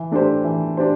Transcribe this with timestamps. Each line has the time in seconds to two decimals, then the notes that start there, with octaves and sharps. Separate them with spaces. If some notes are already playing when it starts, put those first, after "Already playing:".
Already playing: E3
0.11 A3 D4 G4 C5
0.44 E3
0.77 D4 G4 C5